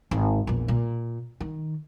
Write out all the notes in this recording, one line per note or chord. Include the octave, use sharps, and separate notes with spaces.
G#1
A#1 E2
A#2
D#3